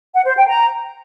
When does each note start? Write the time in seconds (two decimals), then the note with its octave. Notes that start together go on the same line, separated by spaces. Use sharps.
0.15 F#5
0.26 C5
0.37 G5
0.48 A#5